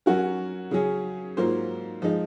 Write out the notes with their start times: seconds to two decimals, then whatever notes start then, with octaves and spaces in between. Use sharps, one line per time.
0.06 F#3 C#4 F#4 A#4
0.71 C#3 F#3 C#4 G#4
1.37 G#2 F#3 A#3 F4 C5
2.02 F3 G#3 D#4